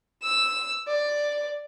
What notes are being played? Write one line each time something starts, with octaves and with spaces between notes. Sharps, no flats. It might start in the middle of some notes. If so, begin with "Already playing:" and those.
E6
D5